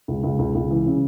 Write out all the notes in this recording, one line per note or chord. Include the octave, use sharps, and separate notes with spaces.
C#2
C#2
C#2
C#2
E3
C#3